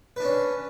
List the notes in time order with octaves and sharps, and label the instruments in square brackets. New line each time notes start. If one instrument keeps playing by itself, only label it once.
[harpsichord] B4
D4
C#4